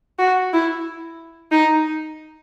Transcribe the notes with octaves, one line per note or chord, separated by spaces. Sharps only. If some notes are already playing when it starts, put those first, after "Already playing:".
F#4
E4
D#4